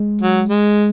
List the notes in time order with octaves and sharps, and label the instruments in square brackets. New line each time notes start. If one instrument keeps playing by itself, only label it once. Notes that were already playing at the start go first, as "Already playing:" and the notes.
Already playing: [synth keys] G#3
[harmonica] F#3
G#3